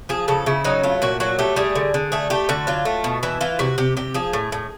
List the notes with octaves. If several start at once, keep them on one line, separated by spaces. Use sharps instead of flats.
F3 G#4
C#3 A4
C#3 E4
F#3 D#4
A3 F4
A#2 F#4
F#3 F#4
A3 G4
G3 G#4
D3
D3
A3 G#4
A3 G4
D3 F#4
F#3 F4
A3
B2
E3 E4
E3 F4
C3 F#4
C3 G4
C3 G4
F3 G#4
A2
A2